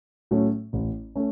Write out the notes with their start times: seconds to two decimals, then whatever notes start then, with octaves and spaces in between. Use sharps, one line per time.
0.31 A2 F#3 A3 C#4
0.73 A1
1.16 A3 C#4